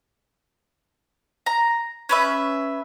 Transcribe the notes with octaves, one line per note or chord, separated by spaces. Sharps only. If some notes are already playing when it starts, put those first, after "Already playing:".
A#5
C#4 B4 E5